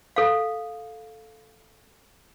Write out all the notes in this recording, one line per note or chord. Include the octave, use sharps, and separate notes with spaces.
A4 F5